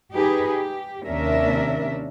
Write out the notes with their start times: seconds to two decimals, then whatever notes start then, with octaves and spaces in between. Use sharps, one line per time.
0.13 D#4 G4 G#4 B4
0.47 G4
1.05 D#2 C3 C#4 D4 A#4 E5